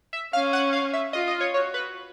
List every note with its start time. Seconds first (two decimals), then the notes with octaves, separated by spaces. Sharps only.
0.13 E5
0.33 C#4 F5
0.53 F#5
0.73 F5
0.93 E5
1.13 F4 D#5
1.28 D#5
1.41 C#5
1.54 F#4 C#5
1.74 B4